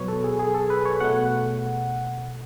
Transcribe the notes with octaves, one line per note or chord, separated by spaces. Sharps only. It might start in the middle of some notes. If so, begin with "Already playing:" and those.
Already playing: B2 F#3 B3 B4 C#5
A4
G#4
G#4
A4
B4
C#5
B2 A3 F#5